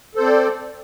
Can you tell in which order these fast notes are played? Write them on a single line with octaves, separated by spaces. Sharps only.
A4 C5 C4 D5